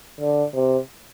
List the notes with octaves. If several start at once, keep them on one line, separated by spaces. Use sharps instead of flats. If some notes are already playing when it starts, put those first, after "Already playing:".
D3
C3